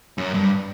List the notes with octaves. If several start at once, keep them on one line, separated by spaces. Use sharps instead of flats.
F#2
G2